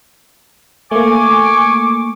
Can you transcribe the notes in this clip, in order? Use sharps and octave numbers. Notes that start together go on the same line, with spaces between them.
A3 A#3 G#5 C#6 D6